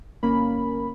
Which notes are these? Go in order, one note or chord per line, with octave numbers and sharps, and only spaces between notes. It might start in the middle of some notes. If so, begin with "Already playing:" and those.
G1 A#3 C#4 A#4 B5